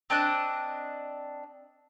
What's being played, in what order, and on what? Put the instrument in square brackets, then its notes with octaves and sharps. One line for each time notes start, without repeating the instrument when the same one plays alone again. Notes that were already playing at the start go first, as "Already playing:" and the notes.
[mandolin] C4 D4 D#5 F#6